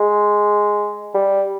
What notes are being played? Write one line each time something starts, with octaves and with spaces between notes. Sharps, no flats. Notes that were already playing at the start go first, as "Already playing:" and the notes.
Already playing: G#3
G3